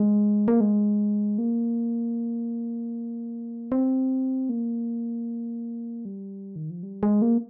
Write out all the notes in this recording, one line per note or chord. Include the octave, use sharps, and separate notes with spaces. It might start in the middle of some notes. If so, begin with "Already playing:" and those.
Already playing: G#3
A#3
G#3
A#3
C4
A#3
G3
D#3
F3
G3
G#3
A#3